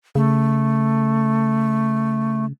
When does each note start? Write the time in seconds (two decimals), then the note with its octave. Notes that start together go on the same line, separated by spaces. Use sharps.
0.15 C#3 A3